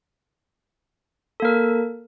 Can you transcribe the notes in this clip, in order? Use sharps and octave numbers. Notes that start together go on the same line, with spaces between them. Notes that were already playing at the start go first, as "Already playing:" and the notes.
A#3 A4 A#4